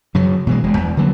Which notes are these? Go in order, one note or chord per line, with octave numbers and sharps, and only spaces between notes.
F#2 C#3 F#3
B2 E3 G3 G#3
E1 G#3
E2
D3 E3 F#3 A#3